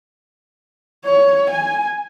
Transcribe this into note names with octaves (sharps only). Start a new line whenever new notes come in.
C#5
G#5